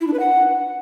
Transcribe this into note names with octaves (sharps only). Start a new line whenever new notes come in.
E4
D4
B4
F#5